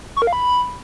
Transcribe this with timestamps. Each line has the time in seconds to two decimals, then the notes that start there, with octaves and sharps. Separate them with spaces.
0.16 C#6
0.22 A#4
0.27 F5
0.33 B5